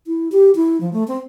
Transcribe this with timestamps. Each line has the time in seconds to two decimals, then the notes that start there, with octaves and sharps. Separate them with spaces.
0.07 E4
0.32 G4
0.55 E4
0.81 F3
0.93 A3
1.08 C4